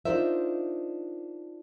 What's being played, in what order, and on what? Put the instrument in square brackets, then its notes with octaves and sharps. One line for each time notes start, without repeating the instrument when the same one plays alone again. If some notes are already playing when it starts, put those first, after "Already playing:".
[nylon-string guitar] D4 D#4 F4 A#4 C5 E5